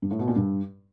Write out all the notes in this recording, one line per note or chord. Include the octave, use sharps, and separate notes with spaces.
G2
A2
B2
A#2
G2